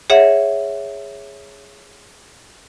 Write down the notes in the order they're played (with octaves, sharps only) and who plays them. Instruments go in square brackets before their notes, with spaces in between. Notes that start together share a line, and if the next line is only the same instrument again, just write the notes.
[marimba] G#4 C#5 E5 F#5